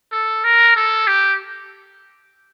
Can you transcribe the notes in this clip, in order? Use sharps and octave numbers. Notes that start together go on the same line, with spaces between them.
A4
A#4
A4
G4